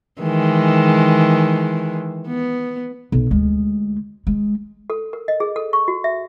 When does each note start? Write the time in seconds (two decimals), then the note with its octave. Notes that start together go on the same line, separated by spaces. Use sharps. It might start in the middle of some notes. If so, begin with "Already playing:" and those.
0.22 D#3 E3 G#3
2.28 B3
3.12 B1
3.31 D2 G#3
4.27 G#3
4.90 A4
5.13 A#4
5.28 D#5
5.40 G#4
5.56 A4
5.73 C#6
5.88 F#4
6.04 E5